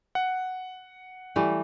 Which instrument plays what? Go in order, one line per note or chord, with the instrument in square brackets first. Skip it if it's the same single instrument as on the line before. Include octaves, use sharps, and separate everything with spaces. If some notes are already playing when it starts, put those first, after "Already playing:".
[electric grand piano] F#5
[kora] E3 G3 A3